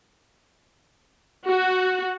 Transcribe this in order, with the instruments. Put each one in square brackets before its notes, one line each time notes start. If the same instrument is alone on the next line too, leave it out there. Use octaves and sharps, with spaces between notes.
[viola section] F#4